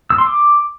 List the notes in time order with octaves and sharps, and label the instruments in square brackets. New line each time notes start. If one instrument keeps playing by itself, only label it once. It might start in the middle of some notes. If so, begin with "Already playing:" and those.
[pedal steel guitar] E6
C6
D6